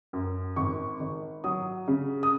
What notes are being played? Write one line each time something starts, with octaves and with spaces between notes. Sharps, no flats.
F#2
G#1 C#6
G#1
F#3 D#6
C#3
D#6